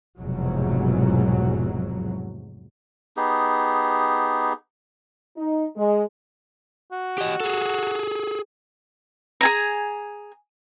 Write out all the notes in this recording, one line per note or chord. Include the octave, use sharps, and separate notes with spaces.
F1 E2 G#2 B2 F#3
B3 D#4 G4 G#4
D#4
G#3
F#4
G4 D#5
G#4 A4
G#4 G#5 A#5